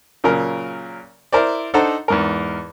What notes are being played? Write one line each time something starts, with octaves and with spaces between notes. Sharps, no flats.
A#2 C#3 F#3 A#4
E4 A#4 C5 D5
D4 D#4 A4 C5 F#5 A#5
E2 G#2 A#4